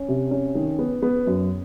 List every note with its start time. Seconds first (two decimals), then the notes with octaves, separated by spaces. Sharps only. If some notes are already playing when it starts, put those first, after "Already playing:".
Already playing: C#4
0.08 C3
0.31 C#4
0.55 D#3
0.79 B3
1.02 B3
1.27 F#2